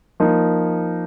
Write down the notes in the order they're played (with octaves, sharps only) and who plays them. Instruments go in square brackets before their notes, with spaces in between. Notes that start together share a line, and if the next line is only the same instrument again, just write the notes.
[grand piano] F3 A#3 D#4